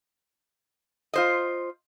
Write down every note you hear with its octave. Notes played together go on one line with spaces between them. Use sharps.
F4 C5 D#5